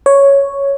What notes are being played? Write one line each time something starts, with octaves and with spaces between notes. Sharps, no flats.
C#5